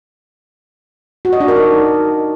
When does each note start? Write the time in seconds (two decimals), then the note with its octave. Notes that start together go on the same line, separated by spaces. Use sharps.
1.25 F#4
1.33 D#5
1.40 D4
1.48 A#4
1.56 D#4